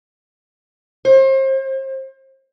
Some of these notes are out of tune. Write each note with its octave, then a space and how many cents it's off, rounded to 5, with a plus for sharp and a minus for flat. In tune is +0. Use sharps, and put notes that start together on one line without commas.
C5 +35